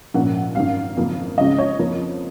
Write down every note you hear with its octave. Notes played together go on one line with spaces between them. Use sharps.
A#1 G#2 F3 A#3 C#4 F#5
G#1 F#2 D#3 F5
F#1 F2 D#3 A#3
C#2 C#3 F3 G#3 C#4 D#5
C#5
F2 F3 A#3 F4